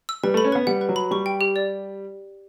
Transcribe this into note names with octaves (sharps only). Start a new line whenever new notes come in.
E6
G3 B4
A3 B5
C#4
B3 B4
G3 F#5
B4
F#3
B5
G3 C#6
G5
G4
D5